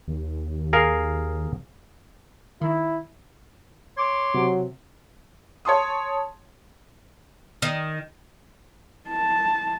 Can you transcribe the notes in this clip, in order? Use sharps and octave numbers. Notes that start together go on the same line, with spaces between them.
D#2
G#4 A#4 F5
D#3 E4
C#5 C6 D6
C3 F#3
C#5 A5 C6 D#6
D#3
A5